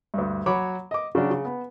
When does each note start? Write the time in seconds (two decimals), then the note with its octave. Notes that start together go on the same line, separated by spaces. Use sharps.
0.14 D2 G2
0.46 F#3 C#5 B5 D6
0.91 D#5 D6
1.15 C#3 F#3 D4
1.31 C#3
1.45 B3